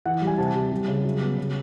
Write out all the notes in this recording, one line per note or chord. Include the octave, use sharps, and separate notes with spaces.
E3 F#5
G3
G#5
C3 A5
C3
G3
C#3
F#3
B3
C#3